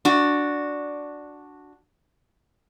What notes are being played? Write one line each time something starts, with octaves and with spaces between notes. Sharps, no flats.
D4 F#4